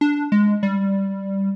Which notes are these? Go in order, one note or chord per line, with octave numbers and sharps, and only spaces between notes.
D4
G#3
G3